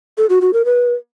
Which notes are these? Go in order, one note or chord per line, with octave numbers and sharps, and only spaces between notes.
A4
F#4
F#4
A#4
B4